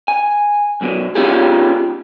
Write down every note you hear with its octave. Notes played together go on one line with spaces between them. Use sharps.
G#5
B1 F#2 B2
B3 C#4 D#4 F4 G4 G#4